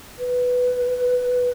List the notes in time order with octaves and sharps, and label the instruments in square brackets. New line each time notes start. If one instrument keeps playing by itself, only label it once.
[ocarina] B4